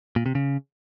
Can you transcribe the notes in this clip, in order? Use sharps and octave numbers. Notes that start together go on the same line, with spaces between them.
A#2
C3
C#3